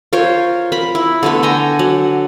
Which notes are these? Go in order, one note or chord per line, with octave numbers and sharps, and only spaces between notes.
F4 A#4 C5 C#5
A#4 B5
E4
D3 A3 B3
G5 G#5 A#5
F#3